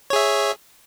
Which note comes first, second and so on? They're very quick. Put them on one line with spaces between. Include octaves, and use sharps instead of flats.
C#5 G#4 E5